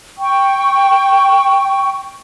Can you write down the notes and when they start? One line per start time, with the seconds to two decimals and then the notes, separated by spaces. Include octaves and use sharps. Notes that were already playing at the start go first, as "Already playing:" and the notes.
0.18 G5 C#6